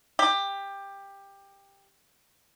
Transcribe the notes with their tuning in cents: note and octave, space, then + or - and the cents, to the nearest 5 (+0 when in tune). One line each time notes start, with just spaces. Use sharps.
G4 +15